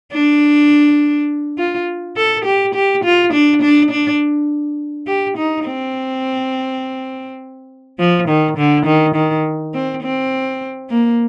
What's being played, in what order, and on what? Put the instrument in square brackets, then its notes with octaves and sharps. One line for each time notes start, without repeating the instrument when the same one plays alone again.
[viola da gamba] D4
F4
A4
G4
G4
F4
D4
D4
D4
G4
D#4
C4
F3
D#3
D3
D#3
D#3
C4
C4
A#3